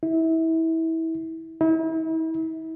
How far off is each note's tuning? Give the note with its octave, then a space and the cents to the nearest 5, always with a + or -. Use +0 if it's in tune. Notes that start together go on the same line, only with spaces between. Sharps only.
E4 -25
E4 -40